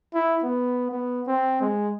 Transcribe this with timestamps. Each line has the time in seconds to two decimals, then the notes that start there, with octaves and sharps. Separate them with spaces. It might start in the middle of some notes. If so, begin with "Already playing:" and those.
0.14 E4
0.43 B3
0.91 B3
1.27 C4
1.61 G#3